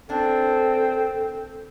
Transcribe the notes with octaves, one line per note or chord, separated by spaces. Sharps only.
A#3 C4 D4 A4